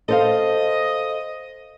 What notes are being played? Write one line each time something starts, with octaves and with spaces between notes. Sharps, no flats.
A4 C5 D#5 F5